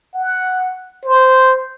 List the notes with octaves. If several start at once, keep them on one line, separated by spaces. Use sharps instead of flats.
F#5
C5